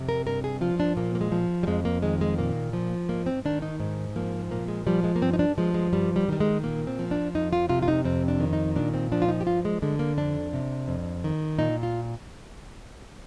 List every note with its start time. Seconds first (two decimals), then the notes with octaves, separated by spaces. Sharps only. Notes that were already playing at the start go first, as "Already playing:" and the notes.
Already playing: F2 C3
0.09 A#4
0.26 G2 A#4
0.44 G#4
0.61 F3 F4
0.80 D4
0.97 A#2 A#3
1.15 A#3
1.21 G#3
1.32 F3
1.63 G3
1.67 F2 G#3
1.85 A#3
2.02 D#3 G#3
2.21 G#3
2.38 A#2 A#3
2.73 F3
3.09 G#2 A#3
3.26 C4
3.45 D#3 D4
3.62 D#4
3.80 G#2
4.16 F3 A#3
4.50 A#2 A#3
4.68 G#3
4.87 F3 G3
5.04 G#3
5.16 A#3
5.22 G2 C4
5.33 D#4
5.39 D4
5.58 F3 G#3
5.74 G#3
5.93 G2 G3
6.16 G3
6.29 D#3 G3
6.40 G#3
6.63 A#2 A#3
6.87 C4
6.99 F3
7.11 D4
7.35 F2 D#4
7.53 F4
7.69 C3 F4
7.82 F4
7.88 D#4
8.04 F2 C4
8.28 D4
8.40 D#3
8.53 D#4
8.76 A#2 D4
8.94 C4
9.12 F3 D4
9.22 F4
9.28 D#4
9.41 G4
9.46 G2 F4
9.65 G#3
9.82 D3 G#3
9.99 A#3
10.17 F2 D4
10.53 C3
10.88 F2
11.24 D#3
11.59 A#2 D#4
11.83 F4